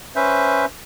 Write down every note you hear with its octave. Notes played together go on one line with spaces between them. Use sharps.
C#4 B4 C5 E5